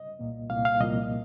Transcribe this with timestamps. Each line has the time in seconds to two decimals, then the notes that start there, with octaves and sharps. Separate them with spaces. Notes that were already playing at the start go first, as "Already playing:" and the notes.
Already playing: D#5
0.19 C2 A#2 A#3
0.49 C2 A#2 A#3 F5
0.65 F5
0.81 C2 A#2 F3 A#3 D#5